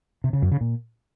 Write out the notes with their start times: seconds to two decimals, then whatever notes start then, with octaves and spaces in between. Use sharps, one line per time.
0.24 C3
0.33 C#3
0.42 F#2
0.52 C#3
0.61 A#2